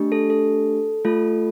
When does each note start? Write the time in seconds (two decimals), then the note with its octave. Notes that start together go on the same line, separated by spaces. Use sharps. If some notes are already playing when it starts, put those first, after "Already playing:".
Already playing: A3 D4 G4
0.12 A4
0.30 A4
1.05 A3 F4 A4